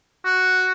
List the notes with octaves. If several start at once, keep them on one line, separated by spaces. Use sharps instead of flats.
F#4